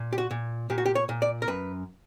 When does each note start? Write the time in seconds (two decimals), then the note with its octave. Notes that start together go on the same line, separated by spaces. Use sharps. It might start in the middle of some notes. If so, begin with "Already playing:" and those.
Already playing: A#2
0.13 G4
0.18 F#4
0.31 A#2
0.70 A#2 G4
0.78 F#4
0.86 G4
0.95 C#5
1.09 A#2
1.22 D5
1.42 A#4
1.48 F#2 B4